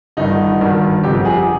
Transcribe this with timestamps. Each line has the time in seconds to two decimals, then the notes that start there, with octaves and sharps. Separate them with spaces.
0.17 G1 G2 D#3 D#4
0.61 G#1 G2 D#3
1.03 G1 F2 C3 G4
1.25 G#4